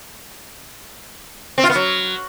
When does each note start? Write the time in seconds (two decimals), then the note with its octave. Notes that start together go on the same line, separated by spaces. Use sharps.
1.58 C4
1.64 F4
1.70 B3
1.75 F#3